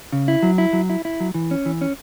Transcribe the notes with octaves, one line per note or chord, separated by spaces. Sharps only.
C#3
E4
F#3
E4
F#3
E4
E4
F#3
E3
C#4
E3
C#4